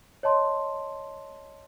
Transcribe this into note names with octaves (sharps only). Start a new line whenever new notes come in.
C#5 D#5 A5 C6